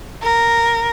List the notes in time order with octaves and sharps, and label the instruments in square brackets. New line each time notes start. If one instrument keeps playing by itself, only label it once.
[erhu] A#4